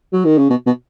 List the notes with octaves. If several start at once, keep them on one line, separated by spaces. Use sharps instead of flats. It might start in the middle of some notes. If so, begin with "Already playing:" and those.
F#3
D#3
C#3
B2
B2